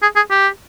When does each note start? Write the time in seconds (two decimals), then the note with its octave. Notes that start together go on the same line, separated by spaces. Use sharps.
0.02 G#4
0.16 G#4
0.30 G4